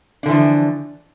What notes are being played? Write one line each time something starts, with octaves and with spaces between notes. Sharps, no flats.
D3 E3 F3 D4